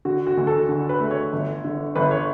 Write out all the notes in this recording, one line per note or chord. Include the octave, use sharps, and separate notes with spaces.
D3 F#4
F#4
D2
A4
D3
B4
A3
C#5
G1
D3
G1 B4
C#5